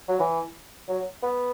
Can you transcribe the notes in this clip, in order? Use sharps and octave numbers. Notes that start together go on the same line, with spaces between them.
F#3
E3
F#3
B3